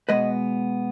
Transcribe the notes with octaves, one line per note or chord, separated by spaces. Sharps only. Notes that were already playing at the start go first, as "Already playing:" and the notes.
B2 G#3 B3 B4 D#5